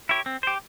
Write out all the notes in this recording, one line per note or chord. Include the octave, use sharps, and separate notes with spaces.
E4 G4 C#5
C4
G4 C5